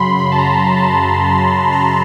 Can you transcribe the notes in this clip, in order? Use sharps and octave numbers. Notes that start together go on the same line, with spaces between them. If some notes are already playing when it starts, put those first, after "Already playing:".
Already playing: F#2 C#3 F#3 B5 C6
B5
A5
A#5
A5
A5
A#5